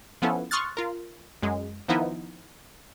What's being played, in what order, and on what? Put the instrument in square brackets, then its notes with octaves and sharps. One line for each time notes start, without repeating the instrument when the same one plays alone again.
[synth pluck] F3 B3 C#4 E4 A4
C6 C#6 D#6 F6 F#6 A6
F4 A#4
F#2 G#3
D#3 F3 B3 D#4 E4